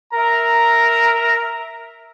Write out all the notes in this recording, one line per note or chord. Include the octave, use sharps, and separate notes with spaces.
A#4 E5 A#5